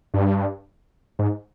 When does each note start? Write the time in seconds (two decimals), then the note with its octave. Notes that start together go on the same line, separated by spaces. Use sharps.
0.14 G2
1.19 G#2